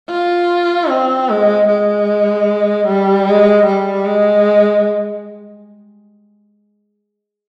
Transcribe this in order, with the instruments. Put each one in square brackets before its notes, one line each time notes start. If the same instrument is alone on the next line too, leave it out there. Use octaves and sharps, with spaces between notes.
[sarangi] F4
C4
G#3
G#3
G3
G#3
G3
G#3